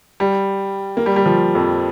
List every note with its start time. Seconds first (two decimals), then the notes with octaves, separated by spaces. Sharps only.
0.20 G3
0.97 A#3
1.06 G3
1.16 G3
1.26 F3
1.55 F2